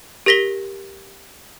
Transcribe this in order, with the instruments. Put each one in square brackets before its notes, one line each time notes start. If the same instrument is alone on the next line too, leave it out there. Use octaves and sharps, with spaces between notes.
[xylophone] G4 A#4 A#6 B6 G7